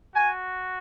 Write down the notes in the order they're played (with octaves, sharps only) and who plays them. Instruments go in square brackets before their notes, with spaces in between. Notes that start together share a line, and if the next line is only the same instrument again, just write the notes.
[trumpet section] F#4 G#5